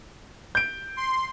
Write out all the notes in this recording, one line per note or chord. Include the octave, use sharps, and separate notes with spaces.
G6 D7
C6